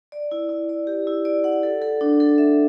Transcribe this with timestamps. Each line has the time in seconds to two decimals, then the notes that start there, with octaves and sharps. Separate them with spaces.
0.12 D5
0.32 E4
0.49 E4
0.69 D5
0.87 G4
1.07 E4
1.25 D5
1.44 F#5
1.63 A4
1.82 A4
2.01 D4
2.20 A4
2.38 E5